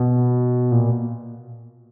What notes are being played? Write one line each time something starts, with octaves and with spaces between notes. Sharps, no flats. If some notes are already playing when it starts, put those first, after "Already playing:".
Already playing: B2
A#2